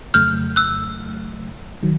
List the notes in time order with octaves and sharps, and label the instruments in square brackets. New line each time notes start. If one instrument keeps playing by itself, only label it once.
[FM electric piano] F2 C#3 F#3 A3 [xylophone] F6 G6
[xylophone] E6 F#6
[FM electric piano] D#3 F#3